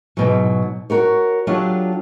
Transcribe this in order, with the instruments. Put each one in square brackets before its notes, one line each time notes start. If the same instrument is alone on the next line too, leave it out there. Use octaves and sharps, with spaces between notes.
[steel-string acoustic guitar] G#2 B2 F#3
F#4 A#4 C#5
F#3 D4 F4 G4 A4 C#5